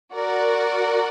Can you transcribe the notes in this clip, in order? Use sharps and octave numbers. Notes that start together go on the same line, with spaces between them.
F#4 A#4 D5 F#5